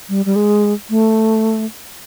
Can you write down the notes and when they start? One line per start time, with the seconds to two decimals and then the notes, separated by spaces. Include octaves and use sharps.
0.09 G3
0.26 G3
0.36 G#3
0.90 A3